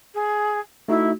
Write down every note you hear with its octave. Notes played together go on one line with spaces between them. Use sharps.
G#4
A3 D#4 E4 F#4